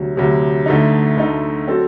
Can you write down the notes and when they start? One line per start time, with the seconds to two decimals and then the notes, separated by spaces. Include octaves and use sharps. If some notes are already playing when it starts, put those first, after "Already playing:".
Already playing: D2 C3 F#3
0.16 D2 C3 F#3
0.66 D2 D3 A3 D#4
1.17 D2 D3 A3 D#4
1.67 F#3 C4 F#4 A4